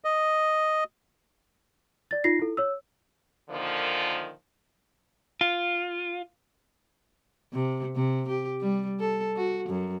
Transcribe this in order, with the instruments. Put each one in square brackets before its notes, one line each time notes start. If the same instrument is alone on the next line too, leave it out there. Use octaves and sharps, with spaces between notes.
[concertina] D#5
[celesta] D5 A6
D#4 F4 A#6 C7
E4 A4
C#5 E6
[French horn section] A#2 D3 D#3 F3
[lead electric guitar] F4
[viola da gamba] C3
C3
G4
G3
A4
F#4
F#2